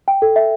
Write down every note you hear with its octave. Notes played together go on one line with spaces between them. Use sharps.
G5
A4
E5